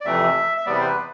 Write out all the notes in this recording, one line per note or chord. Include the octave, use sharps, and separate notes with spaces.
D5
F2 C3 E3 A3 E5
E5
E2 C3 G3 B3 D5
C5
B4